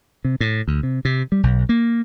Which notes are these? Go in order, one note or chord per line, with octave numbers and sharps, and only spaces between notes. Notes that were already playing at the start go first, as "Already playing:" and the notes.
C3
A2
D2
C3
C3
G3
B1
A#3